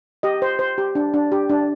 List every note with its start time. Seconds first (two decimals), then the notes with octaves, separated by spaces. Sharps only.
0.23 G4 D#5
0.42 C5
0.59 C5
0.78 G4
0.95 D4
1.14 D4
1.32 G4
1.49 D4